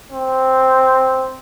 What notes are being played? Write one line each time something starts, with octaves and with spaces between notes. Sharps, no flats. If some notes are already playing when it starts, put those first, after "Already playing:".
C4